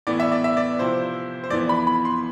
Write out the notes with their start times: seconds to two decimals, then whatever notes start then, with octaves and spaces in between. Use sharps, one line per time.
0.07 A2 E3 B3 D5
0.20 E5
0.32 D5
0.44 E5
0.57 D5
0.79 C3 F3 C4 E4 C5
1.44 C5
1.50 F2 E3 B3 D5
1.69 B5
1.87 B5
2.05 C6